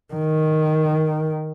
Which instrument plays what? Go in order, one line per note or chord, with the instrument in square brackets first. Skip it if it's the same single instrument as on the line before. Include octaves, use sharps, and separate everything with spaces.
[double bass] D#3